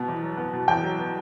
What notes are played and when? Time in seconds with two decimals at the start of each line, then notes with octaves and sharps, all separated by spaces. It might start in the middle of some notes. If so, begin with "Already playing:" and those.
Already playing: B2 B3
0.08 E2
0.23 F#3
0.37 B3
0.53 B2
0.68 E2 G5
0.83 F#3
0.99 B3